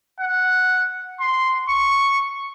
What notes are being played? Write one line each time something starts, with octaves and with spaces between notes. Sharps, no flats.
F#5
C6
C#6